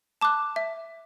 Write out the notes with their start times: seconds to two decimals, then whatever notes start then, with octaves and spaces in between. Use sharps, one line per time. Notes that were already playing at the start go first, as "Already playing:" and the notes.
0.21 A5 D6 F#6
0.56 E5